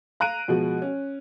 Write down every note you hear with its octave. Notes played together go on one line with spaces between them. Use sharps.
F5 A#5 F#6 D7 D#7
B2 F3 G#3 F#4
C#4